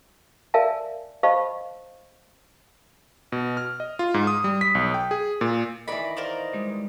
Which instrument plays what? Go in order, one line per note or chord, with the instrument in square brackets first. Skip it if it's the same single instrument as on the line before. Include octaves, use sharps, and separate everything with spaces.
[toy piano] A#4 D5 E5 F5 G#5 A5
C5 D#5 F5 A5 B5 C#6
[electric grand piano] B2
F6
D#5
F4
G#2
D#6
G3
B6
B1
G5
G#4
A#2
[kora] D#3 E3 [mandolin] D5 B5 [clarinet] D#5
[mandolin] A#4 C5 D5 [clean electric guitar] F5
[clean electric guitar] G3 G#3